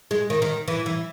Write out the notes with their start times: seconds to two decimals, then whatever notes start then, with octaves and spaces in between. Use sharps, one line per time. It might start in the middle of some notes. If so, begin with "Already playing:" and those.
0.11 G#3
0.30 D#3
0.42 D#3
0.68 E3
0.86 E3